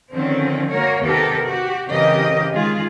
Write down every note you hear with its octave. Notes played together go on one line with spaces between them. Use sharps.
D3 D#3 F3 C4 C#4
A#3 F#4 A#4 C#5
D#2 C3 B3 G4 A4 A#4
F#4 G4
C#3 E3 C4 G4 A#4 D#5
D#3 G#3 F4 G#4